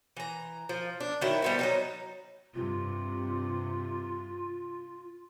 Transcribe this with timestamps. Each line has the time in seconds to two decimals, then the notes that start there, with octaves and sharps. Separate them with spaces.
0.17 E3 A#5
0.69 F3
1.00 D4
1.21 D#3 F#3 E4
1.42 G3 B3 C4
1.59 F#3 G3 D#4
2.55 G2 C3 F4